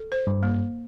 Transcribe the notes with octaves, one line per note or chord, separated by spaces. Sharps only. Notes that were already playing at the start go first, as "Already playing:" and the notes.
Already playing: A4
C5
G2
A#3